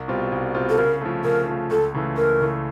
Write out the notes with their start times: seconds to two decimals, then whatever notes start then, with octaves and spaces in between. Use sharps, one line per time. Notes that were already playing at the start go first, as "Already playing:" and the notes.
Already playing: C2
0.08 B2 G3 C4 F4
0.32 C2
0.55 B2 G3 C4 F4
0.69 A4
0.78 C#3 A#4
1.01 F3 A3
1.24 C#3 A#4
1.48 F3 A3
1.71 C#2 A4
1.94 C#3 E3 A3
2.17 C#2 A#4
2.41 C#3 E3 A3